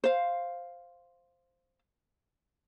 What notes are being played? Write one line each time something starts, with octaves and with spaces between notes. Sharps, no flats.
C5 F5